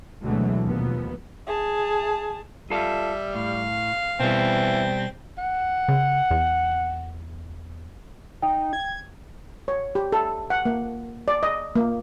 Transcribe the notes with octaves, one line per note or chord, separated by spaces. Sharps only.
D2 B2 E3 F#3 G#3 A3
D#2 B2 F3 B3
G#4 A5
G3 F4 A4 E5 F5
A2 F5
B2 E3 G3 C4
F#5
C#3
E2
D#4 G5
G#6
C#5
G4
A4
F#5
A#3
D5
D#5
A#3